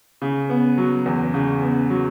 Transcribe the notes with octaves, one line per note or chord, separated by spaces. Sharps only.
C#3
B3
F#3
E2
C#3
B3
F#3